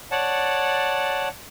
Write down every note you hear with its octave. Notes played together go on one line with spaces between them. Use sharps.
C#5 D5 F#5 A5